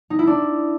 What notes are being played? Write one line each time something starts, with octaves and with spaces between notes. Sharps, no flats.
D#4
E4
D4